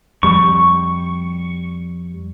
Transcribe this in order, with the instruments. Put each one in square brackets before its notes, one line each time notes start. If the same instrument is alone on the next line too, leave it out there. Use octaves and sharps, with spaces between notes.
[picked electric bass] F2 G3 [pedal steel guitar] C#6